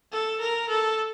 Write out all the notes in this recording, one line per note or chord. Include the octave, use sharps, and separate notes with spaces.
A4
A#4
A4